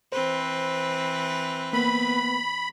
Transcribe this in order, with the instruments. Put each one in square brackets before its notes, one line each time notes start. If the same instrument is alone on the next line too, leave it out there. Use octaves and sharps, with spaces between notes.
[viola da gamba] E3 C4 B4 [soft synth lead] C5
[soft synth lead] A#3 [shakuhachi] B3 [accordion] B5